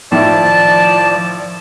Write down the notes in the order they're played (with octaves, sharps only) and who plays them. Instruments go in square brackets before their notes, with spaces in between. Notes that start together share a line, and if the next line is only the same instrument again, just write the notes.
[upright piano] A2 D#3 E4 [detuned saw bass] F3 [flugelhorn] D5 [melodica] A5